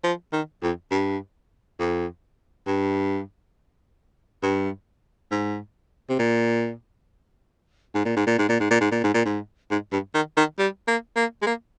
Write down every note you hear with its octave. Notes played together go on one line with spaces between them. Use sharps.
F3
D#3
F2
G2
F2
G2
G2
G#2
C3
A#2
G#2
A#2
G#2
A#2
G#2
A#2
G#2
A#2
G#2
A#2
G#2
A#2
G#2
G#2
G2
D#3
D#3
G3
A#3
A#3
G#3
A#3